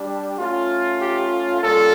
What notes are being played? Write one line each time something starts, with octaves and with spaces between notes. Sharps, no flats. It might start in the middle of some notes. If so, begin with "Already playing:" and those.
Already playing: G3 D4 G4
A3 C#4 F4
G4
G3 A#3 C#4 F4 A4